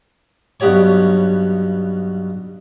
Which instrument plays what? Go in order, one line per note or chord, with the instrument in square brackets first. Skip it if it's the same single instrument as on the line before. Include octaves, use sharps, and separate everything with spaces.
[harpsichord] B1 G2 B3 G4 C#5 C#6